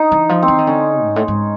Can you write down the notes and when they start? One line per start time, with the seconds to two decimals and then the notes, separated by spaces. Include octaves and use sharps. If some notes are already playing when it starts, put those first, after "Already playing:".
Already playing: D#4
0.12 E3
0.29 F3
0.43 C4
0.48 E3
0.58 D#3
0.67 D3 C#4
1.03 G#2
1.16 A2
1.28 G#2